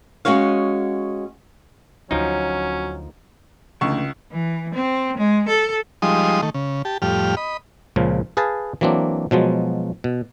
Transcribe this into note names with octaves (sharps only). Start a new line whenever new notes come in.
G#3 C#4 F#4 C#5 F5
D2 F3 F#3 C#4 D#4
C#2 D3 E3 A3 C#6
E3
C4
G#3
A4
F3 G3 G#3 D#4 C6 D#6
D#3 A3
C#3
G4 A5
F2 A2 G3 G4 F6
D#5 B5
C#2 A#2 C#3 F3
G#4 B4 F5 G#5 A5
E3 F#3 A#3 C4 D4
B2 F3 F#3 G#3
B2